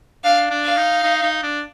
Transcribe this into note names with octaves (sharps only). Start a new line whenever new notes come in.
D4 F5
D4
F5
D#4
D#4
D#4
D4